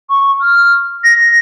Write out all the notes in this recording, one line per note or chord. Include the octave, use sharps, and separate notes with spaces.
C#6
F6
A#6